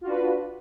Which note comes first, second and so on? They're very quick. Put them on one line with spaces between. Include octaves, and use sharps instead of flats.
F4 F#4 D4 B4